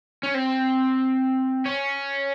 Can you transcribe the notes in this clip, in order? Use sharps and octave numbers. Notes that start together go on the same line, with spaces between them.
C#4
C4
C#4